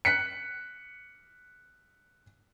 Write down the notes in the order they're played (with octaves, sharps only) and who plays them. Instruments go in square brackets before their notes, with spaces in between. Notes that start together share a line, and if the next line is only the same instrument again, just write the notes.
[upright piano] F#6 B6 C#7